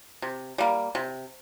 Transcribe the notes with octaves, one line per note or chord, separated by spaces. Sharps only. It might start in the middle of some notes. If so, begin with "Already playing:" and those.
C3
G3 A#3
C3